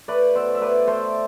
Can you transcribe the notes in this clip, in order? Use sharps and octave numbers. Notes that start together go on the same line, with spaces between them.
A3 B4 D5
B2 C5 E5
E5
A3 B4 D5
A3 A4 C5